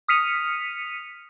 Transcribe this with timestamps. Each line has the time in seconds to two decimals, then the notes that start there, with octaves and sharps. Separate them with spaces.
0.08 D#6 F6 B6 C#7 D#7 F7